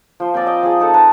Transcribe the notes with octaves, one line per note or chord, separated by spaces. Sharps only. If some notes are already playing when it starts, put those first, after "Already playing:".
F3 C5
C4 A#4 D5 G#5
D5 D#5 G5
F3 G#4
D#4 A4 F#5
B4 A5 A#5